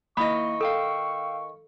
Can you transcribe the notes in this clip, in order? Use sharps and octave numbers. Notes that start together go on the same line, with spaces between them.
D#3 A#3 E4 D#5 B5 C#6 D#6
A4 F5 G5 E6